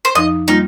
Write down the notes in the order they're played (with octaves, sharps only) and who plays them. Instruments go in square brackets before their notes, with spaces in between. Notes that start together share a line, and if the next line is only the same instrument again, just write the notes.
[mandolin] C5
[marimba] F2 F3 D#4 [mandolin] D#5
[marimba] G3 A#3 F4 [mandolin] D#4